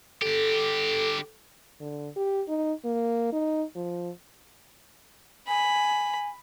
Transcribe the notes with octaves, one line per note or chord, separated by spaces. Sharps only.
D3 G4 A4
D3
G4
D#4
A#3
D#4
F3
G#5 B5